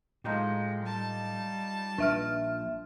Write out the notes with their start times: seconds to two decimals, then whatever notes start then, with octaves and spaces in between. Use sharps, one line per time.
0.24 A2 F3 G#3 D#4 G4
0.83 G3 A5
1.98 A#1 D4 E5 F6